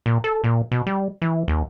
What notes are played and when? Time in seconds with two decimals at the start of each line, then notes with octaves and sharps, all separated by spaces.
0.06 A#2
0.24 A4
0.44 A#2
0.72 B2
0.87 G3
1.22 E3
1.48 D#2